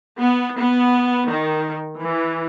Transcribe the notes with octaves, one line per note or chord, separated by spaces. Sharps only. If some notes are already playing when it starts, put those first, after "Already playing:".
B3
B3
D#3
E3